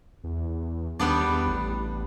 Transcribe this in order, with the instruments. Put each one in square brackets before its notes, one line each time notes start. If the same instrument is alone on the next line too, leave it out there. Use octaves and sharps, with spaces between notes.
[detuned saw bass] E2
[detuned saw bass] D#2 [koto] G3 B3 D4
[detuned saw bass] E2
A1